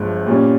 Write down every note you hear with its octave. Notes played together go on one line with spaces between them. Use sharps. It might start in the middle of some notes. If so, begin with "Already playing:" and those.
Already playing: G1 G2 F3 G#3
A#2 G3 C#4